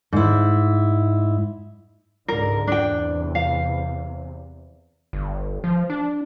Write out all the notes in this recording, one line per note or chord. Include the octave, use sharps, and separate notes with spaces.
G#2 E4
C#2 G#2 D3 A#4
E2 C3 D4 G5
F5
G1
F3
D4